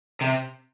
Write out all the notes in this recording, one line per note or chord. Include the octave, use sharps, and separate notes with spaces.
C3